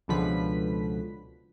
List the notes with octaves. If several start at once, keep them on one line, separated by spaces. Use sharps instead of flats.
C#2 B2 D3 F3 B4 B6